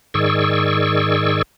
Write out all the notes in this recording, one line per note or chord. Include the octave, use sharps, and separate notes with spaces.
G#2 D#3 G#4 D5 C#6 E6